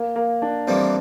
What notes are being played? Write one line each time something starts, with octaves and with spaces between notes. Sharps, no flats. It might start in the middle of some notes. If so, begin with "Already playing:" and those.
Already playing: A#3
A#3
D4
F2 E3 G3 A#3 C4